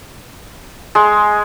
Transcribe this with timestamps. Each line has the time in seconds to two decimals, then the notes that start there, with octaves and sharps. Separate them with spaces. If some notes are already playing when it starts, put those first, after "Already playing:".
0.95 G#3